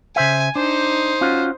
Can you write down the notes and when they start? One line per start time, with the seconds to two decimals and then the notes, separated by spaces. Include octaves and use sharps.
0.16 C#3 C5 E5 G#5
0.56 D4 D#4 C5
1.21 C#4 F4 F#4